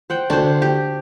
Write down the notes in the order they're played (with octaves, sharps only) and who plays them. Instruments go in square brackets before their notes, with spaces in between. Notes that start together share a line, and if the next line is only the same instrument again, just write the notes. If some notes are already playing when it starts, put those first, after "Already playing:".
[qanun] C5 F#5 G5
[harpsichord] D2 [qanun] D4 C5
[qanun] G4